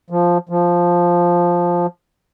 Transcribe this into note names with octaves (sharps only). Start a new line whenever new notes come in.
F3
F3